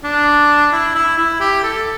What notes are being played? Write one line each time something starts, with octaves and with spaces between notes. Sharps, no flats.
D4
E4
E4
E4
G4
A4